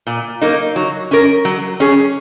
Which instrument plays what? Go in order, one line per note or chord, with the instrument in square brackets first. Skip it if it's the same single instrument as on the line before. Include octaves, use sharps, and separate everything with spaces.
[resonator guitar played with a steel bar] A#2
F#3 A#3 D#4
F#3
C#4 A#4
F#3
C#4 G#4